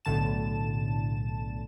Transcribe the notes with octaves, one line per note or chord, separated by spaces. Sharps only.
B1 A2 D3 A5 E7